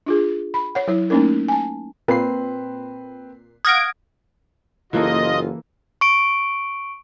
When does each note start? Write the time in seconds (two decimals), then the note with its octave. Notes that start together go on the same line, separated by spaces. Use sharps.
0.06 D4 F4 G#4
0.54 B5
0.75 C#5 F#5
0.88 F#3 E4 C#5
1.10 A3 A#3 C#4 D#4 A#4
1.48 G#5 A5
2.08 A#2 C4 B4 C7
3.65 F5 F#5 D#6 F6 F#6 G#6 A#6 D7
4.93 F#1 E3 A#3 F4 A4 D#5
6.01 C#6 D7